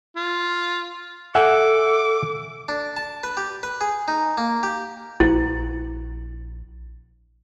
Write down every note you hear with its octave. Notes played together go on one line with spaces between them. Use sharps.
F4
A4 E5 F#5 G#5 D6
D4
A5
B4
G4
B4
G#4
D#4
A#3
G4
A#1 E4